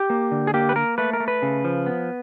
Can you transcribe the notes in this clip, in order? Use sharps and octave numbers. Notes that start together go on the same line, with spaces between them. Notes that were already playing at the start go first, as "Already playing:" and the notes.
Already playing: G4
A#3
D3
G#4
A#3 G4
B4
A#3 A#4
A3 B4
A#4
A3
B4
C#3
F3
B3